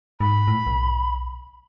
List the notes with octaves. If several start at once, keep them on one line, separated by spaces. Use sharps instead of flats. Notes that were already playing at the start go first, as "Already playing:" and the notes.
G#2 B5
A2
B1